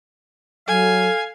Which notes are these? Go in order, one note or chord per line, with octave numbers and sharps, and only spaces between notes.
F#3 A4 F5 G#5